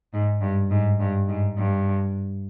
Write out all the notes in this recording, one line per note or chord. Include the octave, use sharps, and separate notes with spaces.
G#2
G2
G#2
G2
G#2
G2